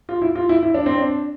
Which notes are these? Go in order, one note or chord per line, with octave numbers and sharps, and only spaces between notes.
F4
E4
F4
E4
E4
D4
C4
D4